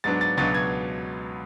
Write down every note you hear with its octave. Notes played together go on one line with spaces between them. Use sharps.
G#2 F#3 B3 D4 A6
A6
C#2 B2 F#3 B3 D4 A6
G#6